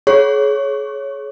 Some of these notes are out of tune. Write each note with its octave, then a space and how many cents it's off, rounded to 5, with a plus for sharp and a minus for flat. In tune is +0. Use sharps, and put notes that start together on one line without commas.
G#4 +35 C#5 +0 C#6 +0